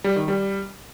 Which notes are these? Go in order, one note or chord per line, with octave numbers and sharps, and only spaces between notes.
G3
D#3
G3